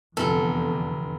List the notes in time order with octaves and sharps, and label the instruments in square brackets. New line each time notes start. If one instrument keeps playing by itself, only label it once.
[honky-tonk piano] F1 [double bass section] E2 D3 [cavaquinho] A4